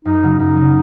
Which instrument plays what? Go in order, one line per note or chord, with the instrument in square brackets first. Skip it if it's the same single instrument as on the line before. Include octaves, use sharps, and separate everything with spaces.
[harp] F#2 [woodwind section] D#4
[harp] C#3 F#3
[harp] F#2 [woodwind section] D#4
[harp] C#3 F#3